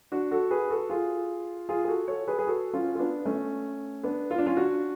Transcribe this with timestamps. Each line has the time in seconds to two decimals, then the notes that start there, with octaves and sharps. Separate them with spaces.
0.12 D4 F#4
0.31 F#4 A4
0.51 G#4 B4
0.70 F#4 A4
0.90 F4 G#4
1.69 F4 G#4
1.84 G#4
1.88 F#4 A4
2.08 A4 C#5
2.27 G#4 B4
2.39 G#4
2.47 F#4 A4
2.73 C#4 F4
2.95 F4
2.99 B3 D4
3.25 A3 C#4
4.03 B3 D4
4.31 F4
4.38 D4
4.46 C#4 F4
4.57 D4 F#4